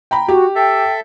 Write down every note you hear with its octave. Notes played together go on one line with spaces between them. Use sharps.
G5 A#5 B5
F#4 G4
A4 E5 G5